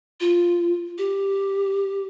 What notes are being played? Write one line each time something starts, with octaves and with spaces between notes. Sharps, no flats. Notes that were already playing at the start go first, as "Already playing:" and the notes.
F4
G4